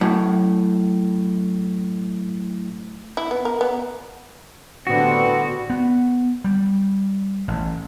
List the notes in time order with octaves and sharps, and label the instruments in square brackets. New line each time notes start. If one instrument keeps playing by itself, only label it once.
[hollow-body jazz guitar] F#2 A2
[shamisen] E4
B3
A#4
B3
[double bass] A2 D3 [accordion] G3 B3 C4 [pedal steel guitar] F#4
[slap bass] B3
G3
A1